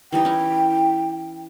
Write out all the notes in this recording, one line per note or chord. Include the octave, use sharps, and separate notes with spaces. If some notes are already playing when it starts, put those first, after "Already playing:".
E3 G3 D#4 G5
C#4 E4